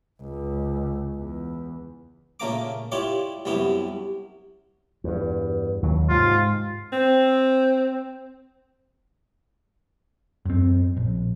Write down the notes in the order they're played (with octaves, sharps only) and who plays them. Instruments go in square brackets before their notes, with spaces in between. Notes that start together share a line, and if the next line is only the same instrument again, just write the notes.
[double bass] C#2
E2
[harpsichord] A#2 C#3 A3 A#3 A#5 D6
E4 F4 G4 C#5 D5
C2 F#2 B3 E4 G4
[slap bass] E2 G2
D#2 F#3
[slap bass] G#2 C3 [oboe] F4
[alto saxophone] C4
[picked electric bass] F#2 C4
A#1